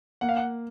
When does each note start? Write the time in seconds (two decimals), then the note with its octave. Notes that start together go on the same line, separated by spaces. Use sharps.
0.21 A#3 F#5
0.29 F5
0.37 F#5